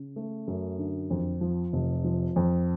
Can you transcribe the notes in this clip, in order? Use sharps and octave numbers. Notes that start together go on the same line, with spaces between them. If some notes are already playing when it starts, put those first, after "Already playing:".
Already playing: C#3
A3
F#2
D3
F2
F3
F1
F3
F2